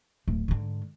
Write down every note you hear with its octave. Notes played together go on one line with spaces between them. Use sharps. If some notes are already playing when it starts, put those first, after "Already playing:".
D1
G#2 D3